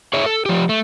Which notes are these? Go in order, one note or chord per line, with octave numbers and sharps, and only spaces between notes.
G#4 C#5 E5
A4
F3 G4
A3